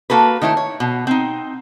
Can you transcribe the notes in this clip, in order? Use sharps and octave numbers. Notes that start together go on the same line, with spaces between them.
A#3 F#4 A4 B4
D#3 A3 E4 C#5
C#5
B2
C4 D#4